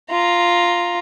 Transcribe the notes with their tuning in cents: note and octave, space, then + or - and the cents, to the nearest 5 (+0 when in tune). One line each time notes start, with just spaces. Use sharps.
F4 +0 A#5 +0